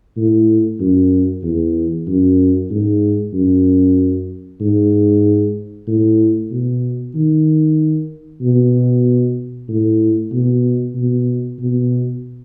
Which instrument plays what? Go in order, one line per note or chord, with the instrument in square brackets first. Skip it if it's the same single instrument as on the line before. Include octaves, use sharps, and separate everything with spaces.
[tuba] A2
F#2
E2
F#2
G#2
F#2
G#2
A2
B2
D#3
B2
A2
B2
B2
B2